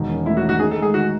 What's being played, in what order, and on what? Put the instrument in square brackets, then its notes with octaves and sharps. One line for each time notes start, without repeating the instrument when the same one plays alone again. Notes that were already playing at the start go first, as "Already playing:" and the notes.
Already playing: [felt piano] E1 D#3
C#4
[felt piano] A3 [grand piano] E4
[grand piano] F#4
[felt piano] D#3
[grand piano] F#4
[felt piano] D#4 [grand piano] G#4
[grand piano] A4
[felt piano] G#3
[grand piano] G#4
[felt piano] D#3 [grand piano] F#4